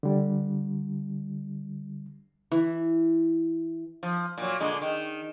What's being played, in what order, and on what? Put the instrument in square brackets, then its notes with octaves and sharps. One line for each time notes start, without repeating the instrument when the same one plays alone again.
[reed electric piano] D3 G3
[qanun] E3
[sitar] F3
A#2 F#3
A#2 D3 G#3
D#3